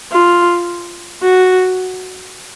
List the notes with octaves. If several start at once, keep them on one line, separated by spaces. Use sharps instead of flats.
F4
F#4